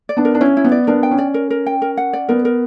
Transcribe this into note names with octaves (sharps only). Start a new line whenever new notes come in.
D5
B3 D4
A#4
D4
C#4 E4
E4
B3
D5
B3 D4 A#4
G5
C#4
D5
A#4
A#4
G5
A#4
F#5
D5
B3 A#4
A#4